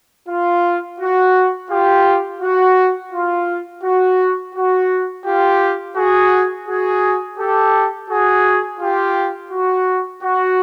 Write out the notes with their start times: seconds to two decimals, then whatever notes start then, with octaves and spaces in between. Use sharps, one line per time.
0.28 F4
0.99 F#4
1.69 F4 G4
2.41 F#4
3.12 F4
3.83 F#4
4.54 F#4
5.24 F4 G4
5.96 F#4 G#4
6.67 F#4 G#4
7.38 G4 A4
8.09 F#4 G#4
8.80 F4 G4
9.51 F#4
10.22 F#4